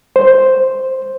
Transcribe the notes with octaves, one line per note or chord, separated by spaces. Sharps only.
C5